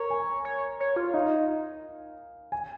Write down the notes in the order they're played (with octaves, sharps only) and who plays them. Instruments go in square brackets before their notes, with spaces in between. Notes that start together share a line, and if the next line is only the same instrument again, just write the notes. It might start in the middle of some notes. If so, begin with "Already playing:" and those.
Already playing: [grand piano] A#4 A#5 [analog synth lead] C#5
[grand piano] G#5
[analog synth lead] C#5
C#5
F4
[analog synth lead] D#4 [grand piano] F5
[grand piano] G#5